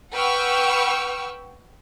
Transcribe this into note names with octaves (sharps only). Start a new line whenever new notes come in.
B4 F#5 G5 C#6 E6 F6